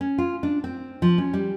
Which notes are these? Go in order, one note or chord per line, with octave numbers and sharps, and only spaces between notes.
C#4
F4
D4
C4
F3
C#4
G3